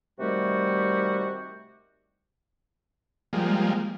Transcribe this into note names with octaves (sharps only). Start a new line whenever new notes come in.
C3 D#3 G3 A3 F#4 G4
F3 G3 G#3 A#3